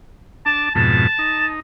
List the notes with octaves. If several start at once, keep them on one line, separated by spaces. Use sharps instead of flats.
D4 A5
F2 G#2 B2 A5
D#4